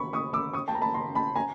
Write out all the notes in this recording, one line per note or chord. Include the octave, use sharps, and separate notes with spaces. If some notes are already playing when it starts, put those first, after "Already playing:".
Already playing: B5 C#6
C#6 D#6
D6 E6
C#6 D#6
G5 A5
A#5
A5 B5
A#5 C6
A5 B5
G#5 A#5